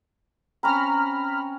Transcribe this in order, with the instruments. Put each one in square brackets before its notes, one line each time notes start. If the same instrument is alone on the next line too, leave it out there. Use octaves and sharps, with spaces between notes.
[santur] C4 C#4 [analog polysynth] A#5 B5 F6